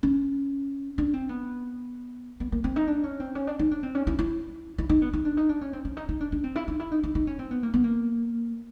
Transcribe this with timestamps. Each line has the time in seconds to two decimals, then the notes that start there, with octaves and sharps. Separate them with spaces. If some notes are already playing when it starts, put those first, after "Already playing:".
0.03 C#4
0.98 D4
1.14 C4
1.29 B3
2.40 B3
2.52 A#3
2.64 C4
2.76 D#4
2.87 D4
3.04 C#4
3.20 C4
3.35 C#4
3.47 D4
3.59 D#4
3.71 D4
3.83 C4
3.95 C#4
4.07 E4
4.19 E4
4.78 E4
4.89 D#4
5.02 B3
5.13 D#4
5.25 D4
5.37 D#4
5.49 D4
5.61 C#4
5.73 C4
5.85 C#4
5.97 D#4
6.09 D#4
6.20 D4
6.32 D4
6.44 C4
6.56 E4
6.68 D#4
6.80 E4
6.92 D#4
7.03 D#4
7.15 D#4
7.27 C#4
7.39 C4
7.51 B3
7.63 A#3
7.74 B3
7.84 A#3